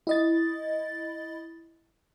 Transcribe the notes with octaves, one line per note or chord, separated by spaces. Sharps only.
E4 D#5 A6